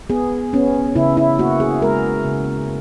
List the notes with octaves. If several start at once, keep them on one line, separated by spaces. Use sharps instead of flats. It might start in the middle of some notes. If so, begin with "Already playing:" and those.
B3 G#4
B3 C#4
C#3 E4
E4
A#3 F#4
G#4
G#3 A#4
C#3